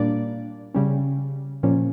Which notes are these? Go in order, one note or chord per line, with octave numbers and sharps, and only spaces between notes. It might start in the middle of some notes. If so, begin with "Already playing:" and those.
Already playing: A#2 G3 A#3 D4 D5
C#3 G3 C#4
A#2 F3 C#4